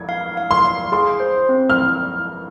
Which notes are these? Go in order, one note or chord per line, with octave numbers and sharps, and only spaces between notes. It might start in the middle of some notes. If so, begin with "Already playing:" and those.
Already playing: G#6
F5
F5
C6
F5
G#4 C6
C5
C4
F6